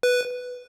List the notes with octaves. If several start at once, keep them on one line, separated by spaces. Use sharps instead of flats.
B4